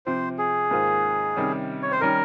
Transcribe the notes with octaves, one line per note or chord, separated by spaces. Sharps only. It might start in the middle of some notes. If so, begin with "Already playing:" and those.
C3 F3 C4 C5
G#4
G#2 D#3 A#3 F4 C5
C3 D#3 G3 C#4
C#5
C5
D#3 G3 C#4 A#4